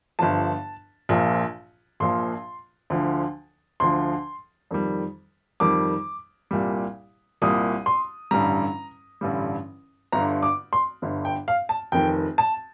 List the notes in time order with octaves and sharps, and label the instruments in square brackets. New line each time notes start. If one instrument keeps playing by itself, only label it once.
[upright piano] G1 G2 D3 F3 A5
A#1 A#2 F3
A#1 A#2 F3 C6
D2 D3 F3
D2 D3 F3 C6
F2 D#3 G3
F2 D#3 G3 D6
C2 A#2 G3
C2 A#2 G3 D#6
C6
A1 G2 D3 G3 A#5
A1 G2 D3 G3
G1 G2 D3 A#5
D6
C6
G1 G2 D3
G5
F5
A5
F1 F2 D#3 G5
A5